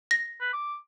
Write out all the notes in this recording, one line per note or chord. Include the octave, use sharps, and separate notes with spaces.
A#6
B4
D6